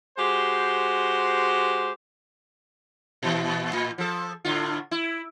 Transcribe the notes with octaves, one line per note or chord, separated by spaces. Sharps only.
G#3 F#4 G4 C5
A#2 E3
A2
F3 A4
A2 D3 F4
E4